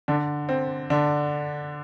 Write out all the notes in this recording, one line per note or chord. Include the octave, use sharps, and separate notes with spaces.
D3 D4
C4
D3 D4